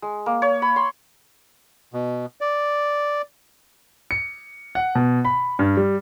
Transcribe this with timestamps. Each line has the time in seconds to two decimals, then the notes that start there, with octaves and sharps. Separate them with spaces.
0.02 G#3
0.26 A#3
0.42 C#5
0.62 B5
0.76 C6
1.94 B2
2.41 D5
4.11 C#7
4.75 F#5
4.95 B2
5.25 B5
5.59 G2
5.77 G3